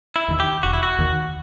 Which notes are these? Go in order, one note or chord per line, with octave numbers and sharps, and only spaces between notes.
E4
D#2 D#3
G4
E1 F#4
E4
F#4
D#2 D#3